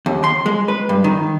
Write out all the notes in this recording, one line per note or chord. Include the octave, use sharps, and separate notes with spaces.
D#2
C6
G#3
B4
G2
D#3